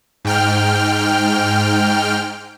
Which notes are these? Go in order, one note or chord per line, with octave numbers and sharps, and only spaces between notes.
G#2 G5 F6